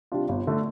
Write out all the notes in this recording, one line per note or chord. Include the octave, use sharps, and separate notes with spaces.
C3 G3 D4 F4
G1
D3 A3